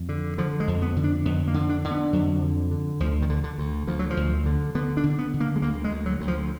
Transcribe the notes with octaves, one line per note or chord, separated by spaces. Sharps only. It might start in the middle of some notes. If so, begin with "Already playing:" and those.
Already playing: F2
D3
D3 F3
G#3
F2
B3
D3
D4
F2 B3
A#3
D3
D4
D3
B3
F2 F#3
D3
D3
D2 F3
D#3
D3
D3
D2
D2 F3
F#3
F3
D2
D3
D3 B3
D4
D3
B3
D3
A#3
G#3
D2 A#3
G#3
D2
F#3
D2
F3